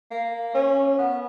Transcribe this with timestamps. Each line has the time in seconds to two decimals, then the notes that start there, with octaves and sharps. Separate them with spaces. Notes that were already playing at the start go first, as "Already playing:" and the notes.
0.11 A#3
0.55 C#4
0.98 B3